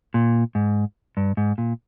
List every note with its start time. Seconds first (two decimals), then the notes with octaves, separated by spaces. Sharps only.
0.14 A#2
0.55 G#2
1.17 G2
1.37 G#2
1.58 A#2